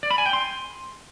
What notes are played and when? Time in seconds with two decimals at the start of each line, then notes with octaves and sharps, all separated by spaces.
0.03 D5
0.11 B5
0.18 G#5
0.26 G5
0.33 C6